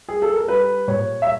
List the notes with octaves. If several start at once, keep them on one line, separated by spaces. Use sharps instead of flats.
G#4
A4
A#4
G3 B4
A#2 C#5
E5